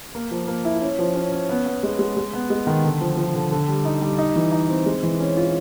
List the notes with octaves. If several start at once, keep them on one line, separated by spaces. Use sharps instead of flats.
A#3
F3
A#3
E4
C#4
F3
C#4
C#4
B3
B3
G#3
G#3
G#3
B3
G#3
D#3
D3
F3
F3
D3
D3
G3
D#4
G3
D#4
E3
D#4
C4
G#3
E3
C#4
F4